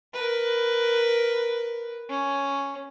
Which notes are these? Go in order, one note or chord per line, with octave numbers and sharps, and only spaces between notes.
A#4 B4
C#4